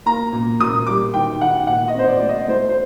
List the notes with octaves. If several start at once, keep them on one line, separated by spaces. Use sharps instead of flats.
A#3 A#5
A#2
A#2 D#6
G3 D6
D#3 G5
D#3 F#5
A#2 F#5
D#5
C4 C5
D5
A3 D5
D#5
A3 C5
C5